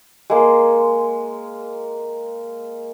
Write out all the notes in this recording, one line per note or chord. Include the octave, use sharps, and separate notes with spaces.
G#3 A#3